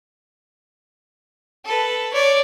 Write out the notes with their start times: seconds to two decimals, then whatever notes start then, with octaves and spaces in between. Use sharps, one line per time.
1.65 A4 B4
2.13 C#5 D5